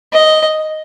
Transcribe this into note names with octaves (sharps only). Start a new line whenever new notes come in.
D#5